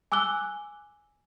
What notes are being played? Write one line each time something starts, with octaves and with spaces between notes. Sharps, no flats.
G#5 D6 E6 F#6 G7